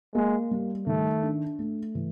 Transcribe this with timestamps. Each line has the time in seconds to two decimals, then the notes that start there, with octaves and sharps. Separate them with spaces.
0.15 G#3 A#3
0.51 G3
0.87 D#3 A3
1.23 D4
1.59 A3
1.95 E3